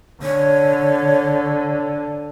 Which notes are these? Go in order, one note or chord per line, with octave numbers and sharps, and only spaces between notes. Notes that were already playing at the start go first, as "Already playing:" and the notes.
D3 C#5